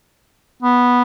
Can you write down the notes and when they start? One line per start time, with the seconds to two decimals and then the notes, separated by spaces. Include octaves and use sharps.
0.63 B3